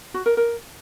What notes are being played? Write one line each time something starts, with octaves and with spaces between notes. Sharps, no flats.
F#4
A#4
A#4